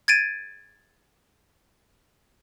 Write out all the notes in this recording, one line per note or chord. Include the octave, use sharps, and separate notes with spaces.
G#6 A6 D7 D#7